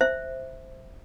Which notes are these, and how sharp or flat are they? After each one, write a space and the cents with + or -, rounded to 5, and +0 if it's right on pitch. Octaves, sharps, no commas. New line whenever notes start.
C5 +0 E5 +0